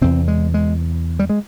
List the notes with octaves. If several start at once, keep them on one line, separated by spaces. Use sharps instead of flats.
E2 C3 C4
G#3
G#3
G3
G#3